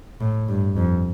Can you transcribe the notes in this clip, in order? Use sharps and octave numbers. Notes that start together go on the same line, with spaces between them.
A2
G2
F2